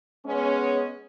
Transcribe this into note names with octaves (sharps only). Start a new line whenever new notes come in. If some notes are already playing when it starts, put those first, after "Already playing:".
G#3 B3 C#4